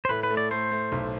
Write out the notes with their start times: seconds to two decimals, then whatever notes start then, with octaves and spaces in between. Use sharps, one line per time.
0.05 C5
0.09 A2 B4
0.23 B4
0.30 A3
0.37 D5
0.51 A3 C5
0.71 A3
0.92 B1